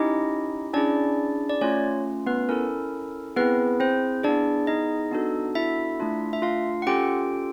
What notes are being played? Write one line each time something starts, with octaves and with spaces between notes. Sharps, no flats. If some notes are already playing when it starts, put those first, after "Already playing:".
Already playing: C#4 D#4 E4 G4 D#5
C#4 D4 E4 G#4 D5
D5
A3 C#4 F4 C#5
B3 B4
C#4 E4 A4 A#4
B3 C4 E4 G#4 B4
C4 C5
B3 D4 E4 G#4 D5
D#4 D#5
B3 D4 F#4 A4
E4 E5
A3 D4 F4
E5
F4 F5
F#5
C#4 F4 G4 A4 G5